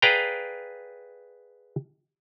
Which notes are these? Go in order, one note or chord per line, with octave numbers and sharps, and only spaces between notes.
G#4 B4 D5 F5 G5 A#5